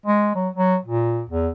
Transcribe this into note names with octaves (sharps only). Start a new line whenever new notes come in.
G#3
F#3
F#3
A#2
E2